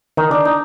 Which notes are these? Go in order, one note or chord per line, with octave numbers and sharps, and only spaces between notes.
D#3 D#4
D4
D#4